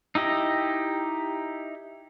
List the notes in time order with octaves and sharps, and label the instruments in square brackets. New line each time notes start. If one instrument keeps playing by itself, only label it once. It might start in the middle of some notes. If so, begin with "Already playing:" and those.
[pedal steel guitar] D#4 E4 G4 D#5